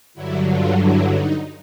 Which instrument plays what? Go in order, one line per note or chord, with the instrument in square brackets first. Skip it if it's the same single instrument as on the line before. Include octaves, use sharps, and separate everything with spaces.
[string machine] G2 D3 F#3 E4
F4
E4
D#4